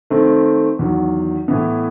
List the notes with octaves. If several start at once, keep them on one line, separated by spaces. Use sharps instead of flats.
D#3 A3 C4
E2 D#3 F#3
A2 E3 B3